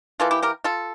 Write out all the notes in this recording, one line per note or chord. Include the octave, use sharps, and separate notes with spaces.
E3 A#3 F4 A4
E4 G4
G4 A#4
F4 A4